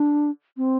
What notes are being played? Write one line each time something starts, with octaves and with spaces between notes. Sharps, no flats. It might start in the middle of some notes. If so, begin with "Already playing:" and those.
Already playing: D4
C4